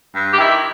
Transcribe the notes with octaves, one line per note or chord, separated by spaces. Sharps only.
G2
G4
D#3 E4